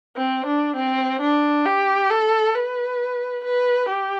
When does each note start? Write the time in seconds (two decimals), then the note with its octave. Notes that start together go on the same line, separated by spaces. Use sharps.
0.17 C4
0.46 D4
0.76 C4
1.21 D4
1.65 G4
2.10 A4
2.54 B4
3.44 B4
3.89 G4